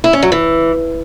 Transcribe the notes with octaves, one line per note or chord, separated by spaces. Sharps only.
E4
C#4
F#3
E3